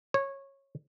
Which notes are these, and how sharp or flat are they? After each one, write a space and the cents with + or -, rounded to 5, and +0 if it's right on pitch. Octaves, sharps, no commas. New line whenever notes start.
C#5 -15